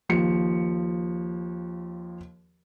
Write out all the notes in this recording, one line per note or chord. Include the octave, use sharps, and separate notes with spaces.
D#2 F3 C#7